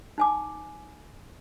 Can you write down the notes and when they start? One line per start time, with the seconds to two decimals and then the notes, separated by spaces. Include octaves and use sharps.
0.18 D#4 G#5 D6